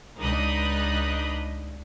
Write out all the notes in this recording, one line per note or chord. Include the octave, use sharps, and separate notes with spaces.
C#2 D4 D#4 D#5 B5 F#6